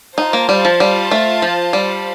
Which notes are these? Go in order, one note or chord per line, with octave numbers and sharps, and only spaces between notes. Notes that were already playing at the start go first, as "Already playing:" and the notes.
D#4 F4 C5 F5 A5
A#3
G3
F3
G3
A3
F3
G3